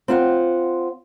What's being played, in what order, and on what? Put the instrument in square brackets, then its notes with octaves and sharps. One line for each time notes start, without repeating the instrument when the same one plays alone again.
[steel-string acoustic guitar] C4 F4 F#5